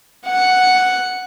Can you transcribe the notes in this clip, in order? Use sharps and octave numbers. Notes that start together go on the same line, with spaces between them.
F#5